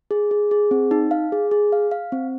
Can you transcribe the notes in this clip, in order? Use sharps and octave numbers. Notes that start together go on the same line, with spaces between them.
G#4
G#4
G#4
C4
D#4
F5
G#4
G#4
F5
F5
C4